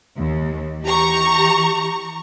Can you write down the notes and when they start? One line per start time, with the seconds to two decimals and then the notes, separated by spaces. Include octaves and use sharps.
0.17 D#2
0.82 E3 G4 A#5 C#6